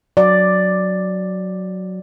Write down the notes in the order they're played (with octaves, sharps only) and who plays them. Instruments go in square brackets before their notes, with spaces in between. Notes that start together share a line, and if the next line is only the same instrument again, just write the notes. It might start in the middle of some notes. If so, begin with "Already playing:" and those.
[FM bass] F#3 [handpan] D5